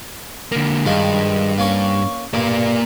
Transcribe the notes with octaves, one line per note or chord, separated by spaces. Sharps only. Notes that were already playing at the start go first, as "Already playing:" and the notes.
D3 A#3
G2 D#3 F3 G#3
A#3 C#4 C#5
G2 A#3 D5